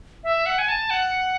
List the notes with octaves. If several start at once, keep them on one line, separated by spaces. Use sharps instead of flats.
E5
F#5
G#5
A5
F#5